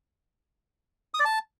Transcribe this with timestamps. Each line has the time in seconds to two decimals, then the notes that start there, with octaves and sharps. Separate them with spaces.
1.14 D#6
1.20 D5
1.25 A5